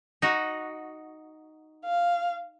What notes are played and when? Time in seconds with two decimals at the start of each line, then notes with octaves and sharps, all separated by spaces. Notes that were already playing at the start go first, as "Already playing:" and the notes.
0.22 D#4 F#4
1.85 F5